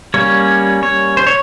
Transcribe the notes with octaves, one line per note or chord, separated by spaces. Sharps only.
G3 A#3 C#4 C#5
C#5
C5
C#5